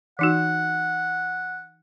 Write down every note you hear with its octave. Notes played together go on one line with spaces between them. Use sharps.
E3 D#4 F#4 F#5